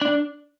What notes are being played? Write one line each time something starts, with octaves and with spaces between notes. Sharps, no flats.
D4